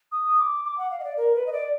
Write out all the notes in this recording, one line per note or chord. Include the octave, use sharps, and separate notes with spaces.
D#6
D6
D6
F#5
F5
D#5
D5
A#4
B4
D#5
D5